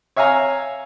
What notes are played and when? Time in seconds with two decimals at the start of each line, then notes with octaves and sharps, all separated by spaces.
0.16 C#5 E5 F5 G#5 A#5